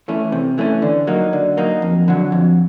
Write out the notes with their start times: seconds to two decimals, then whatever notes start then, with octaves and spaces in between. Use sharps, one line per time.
0.08 E3 A3 C#4
0.32 C3
0.58 E3 A3 C#4
0.82 D3
1.07 F#3 A#3 D#4
1.33 D3
1.57 F#3 A#3 D#4
1.82 F2
2.08 D3 F#3
2.32 F2